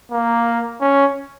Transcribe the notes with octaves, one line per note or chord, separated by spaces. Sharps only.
A#3
C#4